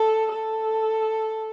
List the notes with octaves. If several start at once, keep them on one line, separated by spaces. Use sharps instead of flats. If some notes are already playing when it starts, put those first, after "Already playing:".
Already playing: A4
A4